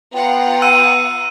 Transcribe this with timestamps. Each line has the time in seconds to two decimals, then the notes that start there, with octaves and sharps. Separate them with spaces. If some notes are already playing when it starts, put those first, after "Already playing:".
0.14 B3 F4 F#5 G5 A#5
0.62 E6 F#6 D#7